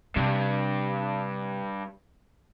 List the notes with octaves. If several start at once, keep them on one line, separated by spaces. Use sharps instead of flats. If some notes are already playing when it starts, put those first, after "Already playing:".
G2 C3